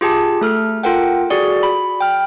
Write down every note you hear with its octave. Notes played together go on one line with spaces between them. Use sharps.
F4 G4 G#4 A5
A3 A4 F6
F4 A4 A#4 F#5 G5
F#4 G#4 D5
B5
G5 F6